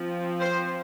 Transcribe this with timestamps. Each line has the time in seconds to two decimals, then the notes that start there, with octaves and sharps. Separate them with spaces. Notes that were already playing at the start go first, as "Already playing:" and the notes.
Already playing: F3 C4
0.40 C5